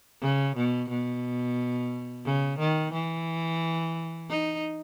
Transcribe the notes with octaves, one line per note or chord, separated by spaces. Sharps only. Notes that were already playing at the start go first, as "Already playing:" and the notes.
C#3
B2
B2
C#3
D#3
E3
D#4